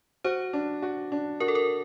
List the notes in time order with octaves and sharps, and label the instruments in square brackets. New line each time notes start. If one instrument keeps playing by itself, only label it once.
[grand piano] F#4 [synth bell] C5
[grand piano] D4
F#4
D4
[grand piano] F#4 [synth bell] A#4
[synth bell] A4
A#4